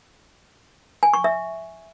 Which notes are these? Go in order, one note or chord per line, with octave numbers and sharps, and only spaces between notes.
G#5
C#6
E5